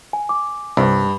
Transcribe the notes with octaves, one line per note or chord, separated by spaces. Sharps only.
G#5
G#5 D6
C2 G2